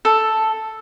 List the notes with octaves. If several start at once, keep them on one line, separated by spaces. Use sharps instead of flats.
A4